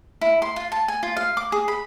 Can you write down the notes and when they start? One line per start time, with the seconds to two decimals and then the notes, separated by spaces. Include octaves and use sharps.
0.21 E4
0.42 C6
0.56 F4
0.72 A5
0.88 G#5
1.03 F4
1.17 F5
1.37 D6
1.52 G#4
1.68 B5